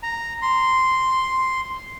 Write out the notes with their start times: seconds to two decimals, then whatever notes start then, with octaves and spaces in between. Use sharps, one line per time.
0.03 A#5
0.42 C6